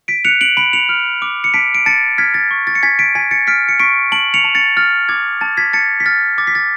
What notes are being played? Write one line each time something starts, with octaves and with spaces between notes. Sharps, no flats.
B6 D7
F#6 C#7 F7
D7 F#7
B5 D7 F#7
C#7 F7
F6
D6
C#7
A5 B6 D7
D7
A5 A6 C#7
F6 G#6 B6
A6
C#6
A6
C#7
G#5 G#6 B6
B6 D7
G#5 G#6 B6
A6 C#7
F6 B6 D7
C#7
C#6 B6 D7
A5 D7 F#7
C#7 F7
A5
A6 C#7
F6 A6
D6 G#6
A5 A6
G#6 B6
A5 A6 C#7
B6
F6 A6
D6 A6
B6
A6